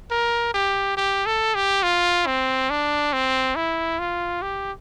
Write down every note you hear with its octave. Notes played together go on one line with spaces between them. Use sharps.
A#4
G4
G4
A4
G4
F4
C4
D4
C4
E4
F4
G4